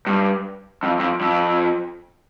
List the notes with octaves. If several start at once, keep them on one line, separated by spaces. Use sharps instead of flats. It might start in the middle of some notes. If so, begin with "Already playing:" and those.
G2
F2
F2
F2